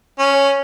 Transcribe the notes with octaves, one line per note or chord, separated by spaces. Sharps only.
C#4